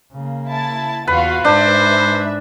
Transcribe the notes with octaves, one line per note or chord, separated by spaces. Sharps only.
C#3 A#3
E4 A5 A6
E2 F4 F#4 B4 F5
G#2 D4 B4 C5 E5